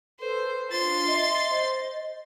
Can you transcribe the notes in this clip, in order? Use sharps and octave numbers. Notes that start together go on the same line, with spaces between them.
A4 B4 C5
D4 F4 C5 C6 A6
D#5 E5
C5 D#5